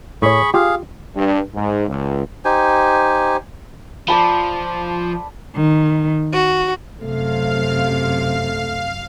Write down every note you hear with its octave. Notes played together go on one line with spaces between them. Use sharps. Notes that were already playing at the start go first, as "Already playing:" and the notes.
A2 G#4 C#5 B5 C#6
F4 G4 G#4 F5
G2
G#2
C#2
D#4 G4 C5 G#5
F3 D5 A5 B5
D#3
F#4
F#2 C3 A3 F5